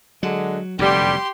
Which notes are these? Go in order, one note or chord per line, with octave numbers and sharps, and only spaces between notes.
D3 F#3 G#3
F1 F#2 B2 D3 G3 G4 C6